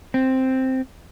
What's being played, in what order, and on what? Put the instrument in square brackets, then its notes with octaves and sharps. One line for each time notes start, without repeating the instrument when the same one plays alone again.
[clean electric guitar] C4